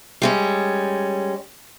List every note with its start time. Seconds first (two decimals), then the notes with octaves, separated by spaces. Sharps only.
0.22 G3 G#3 C#4